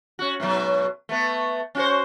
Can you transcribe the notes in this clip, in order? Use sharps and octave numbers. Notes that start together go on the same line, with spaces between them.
C#4 F#4
G#2 B2 F#3
A3 B3
C#4 F#4 C5